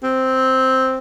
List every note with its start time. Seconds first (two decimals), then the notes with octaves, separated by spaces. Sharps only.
0.03 C4